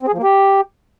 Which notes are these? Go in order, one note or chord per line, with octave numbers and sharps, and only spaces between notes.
C4
G#4
F3
A#3
G4